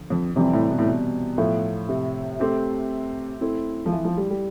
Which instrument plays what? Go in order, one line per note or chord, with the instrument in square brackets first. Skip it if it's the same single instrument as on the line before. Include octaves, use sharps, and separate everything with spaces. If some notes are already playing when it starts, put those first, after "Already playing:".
Already playing: [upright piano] D3 F3
[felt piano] F2
[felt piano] F2 [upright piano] C3 E3 G3 C4
[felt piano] A2
B2
A2
B2
[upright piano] A2 F3 A3
[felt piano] C3
[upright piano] A3 C4 G4
A3 C4 E4
[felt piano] F3
E3
F3
G3
G3